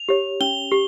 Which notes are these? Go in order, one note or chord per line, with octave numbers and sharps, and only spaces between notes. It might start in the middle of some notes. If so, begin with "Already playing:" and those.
Already playing: F7
G4 C#5
C#4 G7
G4